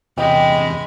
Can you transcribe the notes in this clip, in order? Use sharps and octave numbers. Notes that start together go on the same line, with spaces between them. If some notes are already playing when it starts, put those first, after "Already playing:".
E2 C3 G#3 D#5 G5 B5